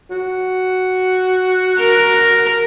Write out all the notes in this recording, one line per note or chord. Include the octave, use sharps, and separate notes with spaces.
F#4
A#4